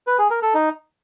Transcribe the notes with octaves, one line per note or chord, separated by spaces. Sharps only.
B4
G#4
A#4
A4
D#4